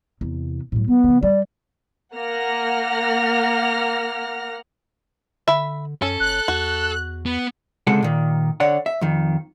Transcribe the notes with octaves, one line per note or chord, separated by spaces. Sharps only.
E2 C3
A2 F#3
F#3 B3
C#3 F3
G3 D5
A#3 F#5 F6 A#6
D3 E5 B5
F#2 C#4 A4
F#1 F#6
E2 F#4
B3
C#2 C3 G#3 A4 F#5
A#2 D#3
D3 C#5 D5 F#5
E5
F2 D#3